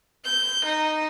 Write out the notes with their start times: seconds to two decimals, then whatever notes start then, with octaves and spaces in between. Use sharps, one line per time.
0.25 G6
0.65 D#4